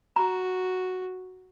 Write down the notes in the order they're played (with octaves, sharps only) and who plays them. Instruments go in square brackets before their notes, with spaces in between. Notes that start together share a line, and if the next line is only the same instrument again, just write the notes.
[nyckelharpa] F#4 [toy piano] A#5